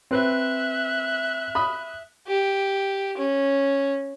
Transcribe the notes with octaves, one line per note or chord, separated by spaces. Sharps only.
C4 B4 E5 F#6
B5 D#6
G4
C#4